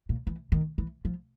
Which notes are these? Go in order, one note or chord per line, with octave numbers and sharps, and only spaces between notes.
A#2
E3
D#3
E3
F3